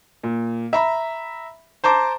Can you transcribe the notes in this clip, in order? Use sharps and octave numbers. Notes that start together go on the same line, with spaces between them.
A#2
E5 A#5 B5
C5 A5 A#5 D6